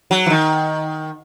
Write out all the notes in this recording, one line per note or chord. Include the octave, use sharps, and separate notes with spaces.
F#3
E3
D#3